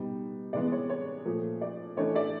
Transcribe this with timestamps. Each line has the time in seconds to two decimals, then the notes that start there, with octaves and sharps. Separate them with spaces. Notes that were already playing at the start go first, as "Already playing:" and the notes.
Already playing: B2 G3 B3 D#4
0.53 C3 E3 G#3 B3 D5
0.72 C#5
0.90 C#5
1.25 A#2 F3 A3
1.61 D5
1.97 E3 A3 D4 C#5 D#5
2.15 D5 E5